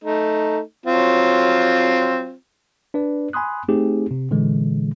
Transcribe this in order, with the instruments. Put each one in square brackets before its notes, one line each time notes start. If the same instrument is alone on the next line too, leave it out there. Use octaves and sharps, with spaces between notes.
[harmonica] A3 D#4
F#3 C4 F4
[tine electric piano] D4 B4 D5
G#5 B5 C6 D#6 F#6
A3 C4 D#4 G4 G#4
C3
A#2 D3 E3 G#3